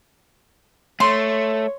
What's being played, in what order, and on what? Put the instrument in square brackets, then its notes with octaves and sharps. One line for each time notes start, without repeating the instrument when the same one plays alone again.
[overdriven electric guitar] A3 [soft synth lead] C#5 [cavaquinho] C6